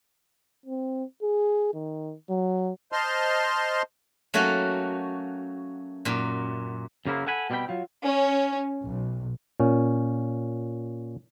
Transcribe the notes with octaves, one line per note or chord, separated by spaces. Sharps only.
C4
G#4
D#3
F#3
C5 D#5 A5 C6 F6
F#3 A3 A#3 C#4 F#4
F#2 A#2
F#2 C#3 A#3 E4 C5
A4 F#5 G#5 B5
B2 G3 C4 G#4 G5 B5
F#3 F4
C#4
B1
A#2 C#4